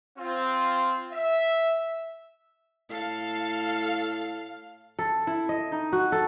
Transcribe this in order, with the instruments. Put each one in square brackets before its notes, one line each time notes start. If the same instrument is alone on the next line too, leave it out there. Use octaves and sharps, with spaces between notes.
[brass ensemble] C4 F4
E5
[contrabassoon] A2 [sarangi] A4 [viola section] F5
[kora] A4
E4
D#5
D#4
F#4
A4